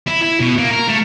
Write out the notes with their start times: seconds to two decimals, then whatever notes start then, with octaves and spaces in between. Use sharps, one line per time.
0.07 E4
0.23 E4
0.40 B2
0.58 A#3
0.71 A#4
0.88 A3